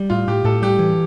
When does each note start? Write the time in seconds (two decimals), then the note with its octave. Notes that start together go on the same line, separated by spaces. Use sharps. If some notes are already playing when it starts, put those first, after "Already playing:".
Already playing: G3
0.10 A2 F4
0.28 A2 G4
0.45 A2 A4
0.62 G3 G4
0.79 E3